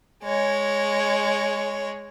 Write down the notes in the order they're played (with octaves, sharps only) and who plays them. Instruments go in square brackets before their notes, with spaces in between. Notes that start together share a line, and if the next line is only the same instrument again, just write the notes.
[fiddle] G#3 C#5